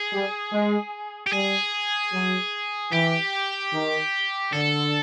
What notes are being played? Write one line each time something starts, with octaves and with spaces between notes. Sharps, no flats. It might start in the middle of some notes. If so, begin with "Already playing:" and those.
Already playing: G#4
G3
G#3
G4
G3 G#4
F#3
E3 G4
D#3
D3 A4